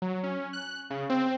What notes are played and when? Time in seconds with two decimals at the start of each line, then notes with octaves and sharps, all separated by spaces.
0.02 F#3
0.23 C#4
0.53 F#6
0.90 C#3
1.10 C4